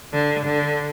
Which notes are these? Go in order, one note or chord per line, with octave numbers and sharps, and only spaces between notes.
D3
D3